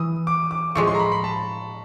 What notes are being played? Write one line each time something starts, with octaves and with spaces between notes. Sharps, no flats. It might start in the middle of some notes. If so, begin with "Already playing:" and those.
Already playing: E3 D#6
D6
D6
A2 F3 G#3 C#6
C6
A#5
B5
B5
A5